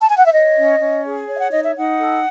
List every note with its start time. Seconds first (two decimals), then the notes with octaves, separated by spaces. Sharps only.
0.01 A5
0.08 G#5
0.17 F#5
0.26 E5
0.33 C#5 D#5
0.57 C#4
0.80 C#4
1.04 G#4
1.27 C#5
1.35 E5
1.39 F#5
1.51 D#4 D#5
1.63 E5
1.75 D#4 F#5
1.98 A4